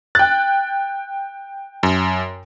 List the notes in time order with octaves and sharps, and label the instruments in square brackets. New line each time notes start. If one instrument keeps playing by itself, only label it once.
[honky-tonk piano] G5 F#6 [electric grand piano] A6
[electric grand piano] F#2